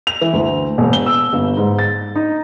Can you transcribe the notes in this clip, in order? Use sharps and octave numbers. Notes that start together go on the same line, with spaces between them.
F7
E3
D2
E1
G7
E6
G1
G#2
A6
D#4